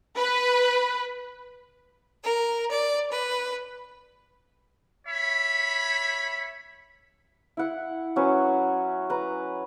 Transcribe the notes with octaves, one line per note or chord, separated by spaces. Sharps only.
B4
A#4
D5
B4
C#5 E5 B5
E4 F#5
F#3 C#4 B4
B4 A#5